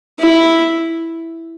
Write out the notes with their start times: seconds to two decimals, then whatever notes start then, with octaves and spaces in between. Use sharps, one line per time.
0.19 E4